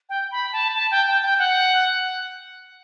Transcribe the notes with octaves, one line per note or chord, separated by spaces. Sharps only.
G5
B5
A5
A5
G5
G5
G5
F#5